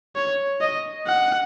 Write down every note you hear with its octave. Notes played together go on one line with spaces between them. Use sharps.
C#5
D#5
F#5